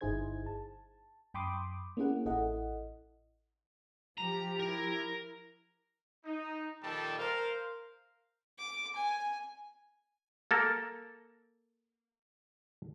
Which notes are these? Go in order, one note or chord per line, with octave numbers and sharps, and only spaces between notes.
G1 D#4 E4 G#4 C5 G#6
A5
F#2 G5 B5 C6 D6 D#6
A#3 C#4 E4 G#4 F#5
A1 E4 A4 D#5 F#5
F3 G4 A#5
E4 A#4
D#4
A#2 D#3 F3 G3 A4 A5
A#4 C5 F5
D6
G#5
A#3 A4 A#4